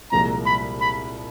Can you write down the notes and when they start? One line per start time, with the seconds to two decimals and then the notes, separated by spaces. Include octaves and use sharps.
0.11 C2 A#2 F3 G#3 A#5
0.46 B5
0.81 B5